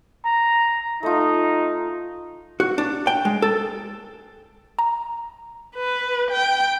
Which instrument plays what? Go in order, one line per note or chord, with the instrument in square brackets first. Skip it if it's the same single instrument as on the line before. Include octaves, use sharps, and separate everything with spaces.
[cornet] A#5
[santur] A3 F4 [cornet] D#4
[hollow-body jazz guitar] F#4
D4
G5
G#3
A4
[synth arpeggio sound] A#5
[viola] B4
G5